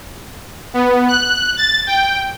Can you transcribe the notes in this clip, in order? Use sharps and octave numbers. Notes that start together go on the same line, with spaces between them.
B3
F#6
A6
G5